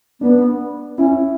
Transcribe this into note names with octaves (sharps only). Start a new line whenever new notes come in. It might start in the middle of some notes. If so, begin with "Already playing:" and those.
B3 D4
C#4 E4